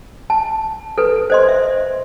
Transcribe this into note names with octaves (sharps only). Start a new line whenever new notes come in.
A5
A4 B4
C5 D#5 C6
E5